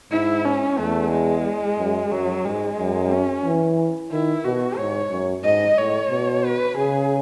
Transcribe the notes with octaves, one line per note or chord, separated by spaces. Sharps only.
G#2 E4
C#4
E2 A3
G#3
F#2
F#2 F#3
G#2 G#3
F#2
C#4
E3
D#3 E4
B2 F#4
G#2 C#5
F#2
G#2 D#5
A2 C#5
B2
B4
C#3 G#4